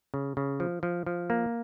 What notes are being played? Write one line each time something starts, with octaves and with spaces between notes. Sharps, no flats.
C#3
C#3
F3
F3
F3
A#3